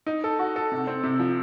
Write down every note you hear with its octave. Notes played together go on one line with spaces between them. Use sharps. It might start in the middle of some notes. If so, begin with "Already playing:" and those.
D#4
A4
F#4
A4
C3
C4
C3
F3